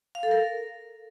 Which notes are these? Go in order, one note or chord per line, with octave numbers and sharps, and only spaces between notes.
F5
A4
A#4